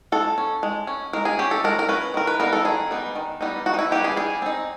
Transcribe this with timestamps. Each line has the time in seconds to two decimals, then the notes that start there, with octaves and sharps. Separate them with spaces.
0.12 G#3 A4
0.38 C#4
0.63 G#3
0.87 C#4
1.13 G#3 A#4
1.25 G#4
1.39 C#4 G4
1.51 A4
1.64 G#3 A#4
1.79 A#4
1.89 C#4 B4
2.14 D#3 A#4
2.27 B4
2.40 G3 B3 D#4 A#4
2.53 A4
2.65 D#3 G#4
2.91 G3 B3 D#4
3.15 D#3
3.41 G3 B3 D#4
3.66 D#3 F#4
3.74 D#4
3.79 E4
3.91 G3 B3 D#4 G4
4.04 G#4
4.17 G3 G#4
4.42 C4 D#4